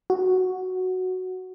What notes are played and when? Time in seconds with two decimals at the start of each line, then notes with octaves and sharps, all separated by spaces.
0.10 F#4